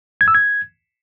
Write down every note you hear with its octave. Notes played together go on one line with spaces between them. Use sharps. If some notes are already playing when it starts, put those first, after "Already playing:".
G#6
E6
G#6